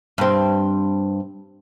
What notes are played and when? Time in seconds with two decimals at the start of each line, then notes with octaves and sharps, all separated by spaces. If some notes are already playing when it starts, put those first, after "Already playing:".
0.18 G2 C4